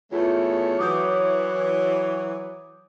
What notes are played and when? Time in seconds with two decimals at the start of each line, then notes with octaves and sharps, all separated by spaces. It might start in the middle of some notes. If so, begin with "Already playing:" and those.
0.12 E2 A3 F4 C#5
0.79 E3 F#3 D6 D#6 G6